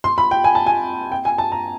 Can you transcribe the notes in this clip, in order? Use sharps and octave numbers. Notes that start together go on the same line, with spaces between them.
C6
B5
G5
G#5
A5
G#5
G5
G#5
A5
A#5